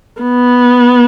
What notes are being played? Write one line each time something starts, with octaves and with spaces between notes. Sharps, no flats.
B3